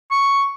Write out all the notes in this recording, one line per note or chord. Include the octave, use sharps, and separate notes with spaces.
C#6